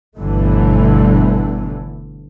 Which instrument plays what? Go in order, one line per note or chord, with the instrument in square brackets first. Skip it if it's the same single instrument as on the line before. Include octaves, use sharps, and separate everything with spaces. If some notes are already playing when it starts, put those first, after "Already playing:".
[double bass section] G1 B2 D3 E3 A3